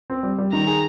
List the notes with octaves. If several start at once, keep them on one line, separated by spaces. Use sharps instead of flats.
C4
G3
G3
D#3 A#5
G#4